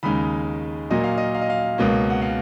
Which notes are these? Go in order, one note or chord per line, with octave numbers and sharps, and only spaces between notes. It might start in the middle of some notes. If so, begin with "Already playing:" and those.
D#2 C#3 G#3 D#4 B5
A#2 F#3 A#3 D#5
F5
D#5
F5
D#5
F5
C#2 B2 A#3 C#4
F#5
F5